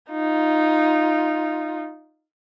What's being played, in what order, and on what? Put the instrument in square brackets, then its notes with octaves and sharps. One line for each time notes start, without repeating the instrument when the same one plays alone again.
[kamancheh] D#4 F4